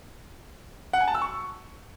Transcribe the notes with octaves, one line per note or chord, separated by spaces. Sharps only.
F#5
G#5
A5
E6
C#6